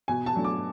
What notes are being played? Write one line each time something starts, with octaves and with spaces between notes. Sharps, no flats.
B2 G#5
A5
F#3 A3 D4
D6